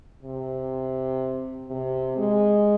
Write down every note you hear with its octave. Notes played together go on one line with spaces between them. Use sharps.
C3
C3
G#3